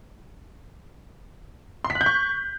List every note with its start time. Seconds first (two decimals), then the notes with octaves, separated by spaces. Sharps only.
1.84 C6
1.90 B6
1.95 F#6
2.01 G6
2.06 C#6